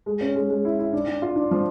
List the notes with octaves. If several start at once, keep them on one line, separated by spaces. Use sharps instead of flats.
G#3
C#4
G#3
G#3
E4
E4
D4
D4
F4
D4
F3